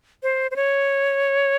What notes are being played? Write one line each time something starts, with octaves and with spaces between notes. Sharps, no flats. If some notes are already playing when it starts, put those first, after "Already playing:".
C5
C5
C#5